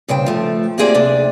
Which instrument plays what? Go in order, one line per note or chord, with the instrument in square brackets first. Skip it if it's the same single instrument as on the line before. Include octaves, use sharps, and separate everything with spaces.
[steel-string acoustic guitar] G2 C#3 C5 G5
F3 A3
A#3 C4 G4 G#4 C5 D5
D2 C3 D4